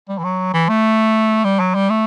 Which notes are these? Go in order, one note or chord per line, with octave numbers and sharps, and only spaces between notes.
G3
E3
F#3
E3
A3
G3
F#3
G3
A3